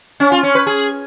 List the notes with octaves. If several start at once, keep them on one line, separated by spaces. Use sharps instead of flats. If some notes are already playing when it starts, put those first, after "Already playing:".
C#4
F4
C#4
B4
G#4